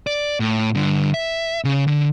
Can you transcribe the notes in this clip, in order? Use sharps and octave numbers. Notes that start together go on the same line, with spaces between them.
D5
A2
G2 D3
E5
C#3
D3